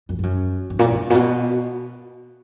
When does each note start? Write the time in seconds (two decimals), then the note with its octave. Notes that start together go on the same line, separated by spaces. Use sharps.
0.09 F#2
0.19 G2
0.23 F#2
0.70 G2
0.79 A#2
0.90 G2
1.10 A#2
1.15 B2